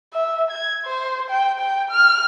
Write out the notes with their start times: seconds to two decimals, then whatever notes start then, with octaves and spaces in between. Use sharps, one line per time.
0.13 E5
0.51 G#6
0.85 C5
1.30 G5
1.59 G5
1.91 F6